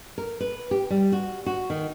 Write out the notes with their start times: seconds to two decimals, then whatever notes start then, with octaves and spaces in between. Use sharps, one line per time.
0.18 A#4
0.40 B4
0.71 G4
0.90 G3
1.12 F#4
1.46 F#4
1.70 D#3